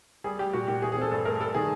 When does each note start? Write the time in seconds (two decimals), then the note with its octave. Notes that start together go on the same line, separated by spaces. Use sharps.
0.24 G3 G#4
0.39 G3 G4
0.53 A#2 F#4
0.68 A#2 G4
0.82 E3 G#4
0.92 G#4
0.97 C4 A4
1.11 G2 A4
1.25 A3 A#4
1.40 G3 A4
1.54 D#3 G#4